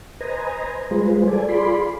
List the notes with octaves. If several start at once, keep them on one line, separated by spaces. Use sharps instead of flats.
B4 C5 D#5 G#5 A#5
G3 G#3 F4 G#4 B4 C5
A4 D5 G#5
F4 G#4 D5 B5 C6